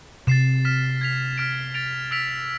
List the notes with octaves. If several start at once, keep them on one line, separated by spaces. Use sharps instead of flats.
C3 A6 C7 E7
F6 B6 E7
G#6 B6 F7
F6 B6 D7
A6 D7 F7
E6 B6 D7 F7